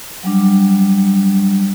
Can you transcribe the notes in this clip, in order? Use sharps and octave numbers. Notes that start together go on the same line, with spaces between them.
F#3 G3 D4